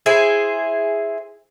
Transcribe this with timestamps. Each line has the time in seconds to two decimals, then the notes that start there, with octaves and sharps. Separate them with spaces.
0.06 E4 G#4 C5